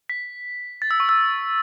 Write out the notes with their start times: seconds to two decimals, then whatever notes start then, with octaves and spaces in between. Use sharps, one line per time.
0.09 B6
0.82 A6
0.91 E6
1.00 C#6
1.09 E6